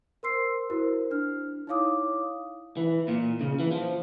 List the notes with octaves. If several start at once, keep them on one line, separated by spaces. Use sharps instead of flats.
A#4 C5 C6 E6 C7
E4 F#4 A#4 C5
D4 F6
D#4 E4 C#5 F5 D6 D#6
E3
A#2
C#3
E3
F3